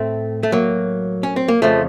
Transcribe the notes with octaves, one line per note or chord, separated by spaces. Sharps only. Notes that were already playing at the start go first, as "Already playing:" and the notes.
Already playing: A2 A3 C4
A3
F#3 A#3
C#4
C4
A#3
F2 C#3 F3 A3